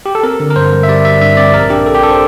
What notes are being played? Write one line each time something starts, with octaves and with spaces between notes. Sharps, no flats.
G4
A4
C4 A#4
D3
A#4
G2 C5
G3
E5
G3 D5
G3 E5
G2 E5
C4 D5
A#1 A#4
D4 G4
D4 A4
G4
D4 A4
C5